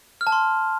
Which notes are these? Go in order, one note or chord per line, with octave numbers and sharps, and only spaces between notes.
F6
A5
C6